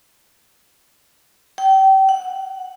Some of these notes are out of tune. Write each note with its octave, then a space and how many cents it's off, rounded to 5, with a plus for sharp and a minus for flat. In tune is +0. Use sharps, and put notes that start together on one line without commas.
G5 -30
F#5 +5